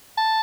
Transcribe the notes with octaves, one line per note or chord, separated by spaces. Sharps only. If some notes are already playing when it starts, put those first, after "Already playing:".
A5